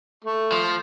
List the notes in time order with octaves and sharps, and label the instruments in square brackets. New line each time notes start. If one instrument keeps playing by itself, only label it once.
[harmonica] A3
[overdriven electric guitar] F3